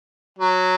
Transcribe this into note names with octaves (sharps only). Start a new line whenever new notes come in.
F#3